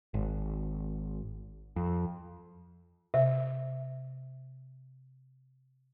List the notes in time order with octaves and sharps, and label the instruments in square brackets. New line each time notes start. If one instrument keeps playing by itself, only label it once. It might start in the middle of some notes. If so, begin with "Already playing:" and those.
[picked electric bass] G#1
F2
[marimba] C3 [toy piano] E5